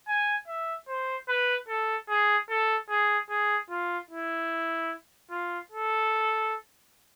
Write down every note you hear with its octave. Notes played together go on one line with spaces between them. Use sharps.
G#5
E5
C5
B4
A4
G#4
A4
G#4
G#4
F4
E4
F4
A4